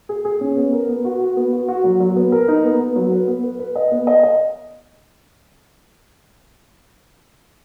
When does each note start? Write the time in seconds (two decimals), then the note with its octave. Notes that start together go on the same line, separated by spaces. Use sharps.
0.09 G#4
0.25 G#4
0.41 C#4
0.57 B3
0.73 A#4
0.89 B3
1.05 F#4
1.20 F#4
1.36 B3
1.53 F#4
1.68 F#4
1.84 F#3
2.00 F#3
2.16 B3
2.32 A#4
2.48 D#4
2.64 B3
2.79 B3
2.96 F#3
3.12 B4
3.27 B3
3.43 B4
3.59 B4
3.76 D#5
3.91 B3
4.07 D#5
4.23 D#5